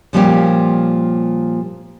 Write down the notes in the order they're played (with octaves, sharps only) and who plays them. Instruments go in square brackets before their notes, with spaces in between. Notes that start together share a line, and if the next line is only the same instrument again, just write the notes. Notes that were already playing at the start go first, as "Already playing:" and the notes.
[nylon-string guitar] A#2 F3 G3 A#3 C#4 G4